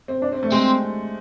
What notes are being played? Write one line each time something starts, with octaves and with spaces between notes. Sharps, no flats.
C4
D4
C4
A3
G#3 C4